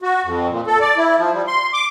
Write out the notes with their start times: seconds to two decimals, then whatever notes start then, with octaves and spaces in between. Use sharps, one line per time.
0.02 F#4
0.24 F2
0.50 A#2
0.67 A4
0.81 D5
0.98 E4
1.17 F3
1.33 G3
1.47 C6
1.73 D6